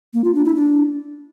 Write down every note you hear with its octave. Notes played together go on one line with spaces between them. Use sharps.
A#3
F4
D4
E4
D4